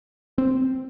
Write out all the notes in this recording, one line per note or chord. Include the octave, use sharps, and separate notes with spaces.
C4